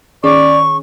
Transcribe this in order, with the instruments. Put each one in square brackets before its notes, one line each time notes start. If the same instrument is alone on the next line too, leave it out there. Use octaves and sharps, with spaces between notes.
[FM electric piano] D#3 C#4 G#4 [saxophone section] D5 [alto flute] C#6